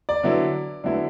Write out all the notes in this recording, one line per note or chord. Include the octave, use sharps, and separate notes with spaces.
D5
D3 F#3 B3 E4
D3 F#3 B3 E4